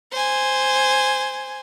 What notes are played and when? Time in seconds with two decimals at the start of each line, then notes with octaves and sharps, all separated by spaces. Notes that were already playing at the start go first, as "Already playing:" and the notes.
0.11 C5 G#5